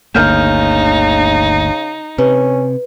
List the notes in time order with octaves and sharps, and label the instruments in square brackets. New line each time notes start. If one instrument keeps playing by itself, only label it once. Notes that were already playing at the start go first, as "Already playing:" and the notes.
[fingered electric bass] G1 D2 A#3 [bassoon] C#3 [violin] D#4 [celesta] F6 G6
[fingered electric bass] C3 [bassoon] C#4 [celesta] B4